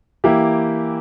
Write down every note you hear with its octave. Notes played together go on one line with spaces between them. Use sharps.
E3 A#3 E4 G4